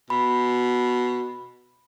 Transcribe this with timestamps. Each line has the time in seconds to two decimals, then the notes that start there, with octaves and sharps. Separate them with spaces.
0.10 B2 B5